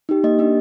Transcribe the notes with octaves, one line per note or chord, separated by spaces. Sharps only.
D#4 G4
A#3 D#5
D4 G4